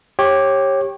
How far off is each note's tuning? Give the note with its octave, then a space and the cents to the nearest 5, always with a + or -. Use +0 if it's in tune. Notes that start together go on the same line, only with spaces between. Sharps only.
G4 +0 C#5 -20